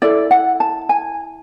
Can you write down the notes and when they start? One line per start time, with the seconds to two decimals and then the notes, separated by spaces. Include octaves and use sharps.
0.02 E4 A4 D5
0.31 F#5
0.60 A5
0.89 G#5